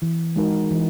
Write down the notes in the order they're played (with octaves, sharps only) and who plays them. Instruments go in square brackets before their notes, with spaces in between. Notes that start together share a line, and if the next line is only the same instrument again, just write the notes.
[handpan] E3
G#3 D#4 F#4 A#4
E3